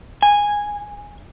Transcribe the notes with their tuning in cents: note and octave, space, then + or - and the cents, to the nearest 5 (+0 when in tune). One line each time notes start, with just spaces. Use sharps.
G#5 -10